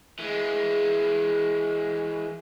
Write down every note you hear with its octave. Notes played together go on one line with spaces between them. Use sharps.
E3 G#3